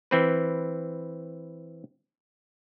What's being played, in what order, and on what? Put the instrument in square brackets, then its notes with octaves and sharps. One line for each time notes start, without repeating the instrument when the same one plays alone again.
[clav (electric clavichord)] E3 C4 B4